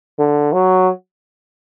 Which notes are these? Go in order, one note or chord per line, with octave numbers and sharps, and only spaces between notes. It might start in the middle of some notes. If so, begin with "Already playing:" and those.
D3
F#3